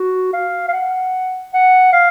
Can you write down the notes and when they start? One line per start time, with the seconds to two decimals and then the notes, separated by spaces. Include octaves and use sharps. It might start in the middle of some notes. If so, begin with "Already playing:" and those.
Already playing: F#4
0.33 F5
0.68 F5
0.73 F#5
1.53 F#5
1.93 F5